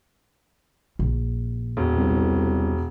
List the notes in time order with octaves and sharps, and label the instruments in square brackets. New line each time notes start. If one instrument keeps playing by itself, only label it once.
[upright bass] A#1
[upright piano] E1
[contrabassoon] C2